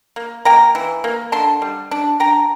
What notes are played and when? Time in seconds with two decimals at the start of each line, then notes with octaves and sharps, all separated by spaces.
0.16 A#3
0.45 A#3 G5 A#5
0.75 E3
1.04 A#3
1.32 D3 A5 C6
1.62 G3
1.91 D4
2.20 D4 G5 A#5